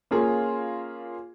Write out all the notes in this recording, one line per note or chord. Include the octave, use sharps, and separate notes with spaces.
A#3 C#4 F4 G#4